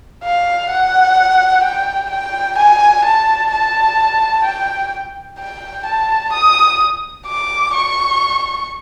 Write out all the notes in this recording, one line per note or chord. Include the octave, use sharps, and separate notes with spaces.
F5
F#5
G5
G5
G#5
A5
A5
G5
G5
A5
D#6
D6
C#6